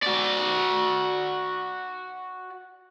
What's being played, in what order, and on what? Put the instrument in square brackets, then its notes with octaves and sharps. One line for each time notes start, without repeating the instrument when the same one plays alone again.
[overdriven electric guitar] F#4 D5